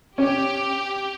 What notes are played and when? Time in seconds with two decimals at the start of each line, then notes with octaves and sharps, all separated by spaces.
0.18 C#4 G4